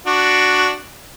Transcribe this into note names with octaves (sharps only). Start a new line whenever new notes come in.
D4 F#4